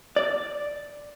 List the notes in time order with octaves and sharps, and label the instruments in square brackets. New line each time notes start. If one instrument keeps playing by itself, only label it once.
[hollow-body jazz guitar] D5